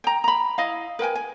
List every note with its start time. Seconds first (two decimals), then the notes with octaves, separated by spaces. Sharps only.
0.04 G5 A#5
0.24 A#5 B5
0.58 E4 D#5 F5
0.99 A#4 B4 G5 G#5
1.15 G#5